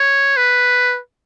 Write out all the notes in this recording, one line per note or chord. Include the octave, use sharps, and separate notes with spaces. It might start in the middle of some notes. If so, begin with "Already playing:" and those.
Already playing: C#5
B4